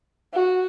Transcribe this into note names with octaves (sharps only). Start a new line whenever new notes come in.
F#4